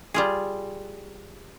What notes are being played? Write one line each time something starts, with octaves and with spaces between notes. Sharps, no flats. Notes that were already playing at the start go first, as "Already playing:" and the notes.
G3 F4 G#4